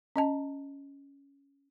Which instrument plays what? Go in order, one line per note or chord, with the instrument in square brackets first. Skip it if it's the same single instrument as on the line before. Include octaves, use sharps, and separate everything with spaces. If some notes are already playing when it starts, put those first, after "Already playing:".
[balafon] C#4 D#5 A5